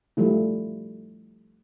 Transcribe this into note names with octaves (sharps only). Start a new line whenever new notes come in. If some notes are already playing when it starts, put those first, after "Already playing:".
F3 G3 A3 E4